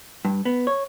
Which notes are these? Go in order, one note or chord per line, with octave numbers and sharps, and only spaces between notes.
G2
B3
C#5